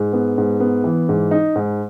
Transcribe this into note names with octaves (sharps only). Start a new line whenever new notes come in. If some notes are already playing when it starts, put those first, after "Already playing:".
Already playing: G#2
B3
G#2
B3
E3
G#2
D#4
G#2